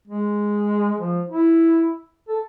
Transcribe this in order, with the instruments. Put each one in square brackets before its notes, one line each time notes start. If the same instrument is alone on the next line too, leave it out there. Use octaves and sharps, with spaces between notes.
[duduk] G#3
F3
E4
A4